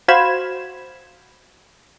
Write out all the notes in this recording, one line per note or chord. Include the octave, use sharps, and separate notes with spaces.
F#4 C5 F5 B5 G#6 E7